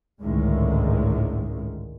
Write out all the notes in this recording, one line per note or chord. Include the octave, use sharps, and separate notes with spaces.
G#1 C#2 A2 D3 D#3 G#3